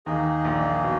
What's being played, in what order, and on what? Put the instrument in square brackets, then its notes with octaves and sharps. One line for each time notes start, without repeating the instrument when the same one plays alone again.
[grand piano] D#2 D#3 [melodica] A#3 D#4 G#4
[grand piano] A#1 A#2
B2